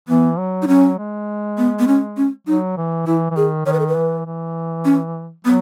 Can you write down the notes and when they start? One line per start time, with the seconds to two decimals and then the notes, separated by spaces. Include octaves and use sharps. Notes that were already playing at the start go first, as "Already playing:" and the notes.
0.08 E3 B3
0.39 F#3
0.62 D#4
0.68 F#3 C#4
0.98 G#3
1.58 B3
1.79 B3
1.87 C#4
2.17 C#4
2.47 F#3 D#4
2.77 E3
3.07 E3 E4
3.31 E3
3.36 D#3 G#4
3.66 D#3 C#5
3.73 B4
3.80 A4
3.87 B4
3.95 E3
4.26 E3
4.85 C#4
5.45 F#3 B3